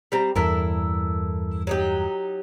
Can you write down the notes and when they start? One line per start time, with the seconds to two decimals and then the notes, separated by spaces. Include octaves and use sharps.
0.12 G3 C4 A#5
0.35 E2 G2 E4 A4 A#4
1.67 F#3 D#4 G4